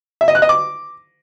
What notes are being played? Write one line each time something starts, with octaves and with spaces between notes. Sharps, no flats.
E5
D#5
F#6
D#5
D6